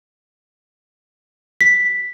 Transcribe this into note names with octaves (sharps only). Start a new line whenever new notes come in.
B6